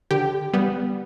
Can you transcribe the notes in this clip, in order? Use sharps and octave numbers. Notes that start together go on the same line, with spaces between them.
D3 G4
G3 B3